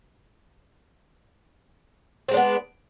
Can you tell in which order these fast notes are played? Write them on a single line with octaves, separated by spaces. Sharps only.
C4 G#3 D4 B3